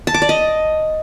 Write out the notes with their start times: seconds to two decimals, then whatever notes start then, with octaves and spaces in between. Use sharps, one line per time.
0.07 A5
0.14 D6
0.22 D5
0.29 D#5